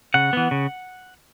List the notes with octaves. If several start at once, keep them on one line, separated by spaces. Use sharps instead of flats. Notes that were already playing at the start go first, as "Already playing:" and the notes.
C#3 F#5
E3 B3
C#3